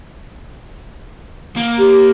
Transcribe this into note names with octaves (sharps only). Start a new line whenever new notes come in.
A#3
G4